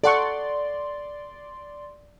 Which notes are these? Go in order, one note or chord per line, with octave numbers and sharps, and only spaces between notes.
A4 D5 F#5 C6 C#6